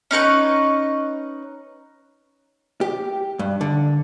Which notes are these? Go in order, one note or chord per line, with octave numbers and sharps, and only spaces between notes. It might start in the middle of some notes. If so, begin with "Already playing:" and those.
C#4 D#4 B4 C#6
G4
G2
D3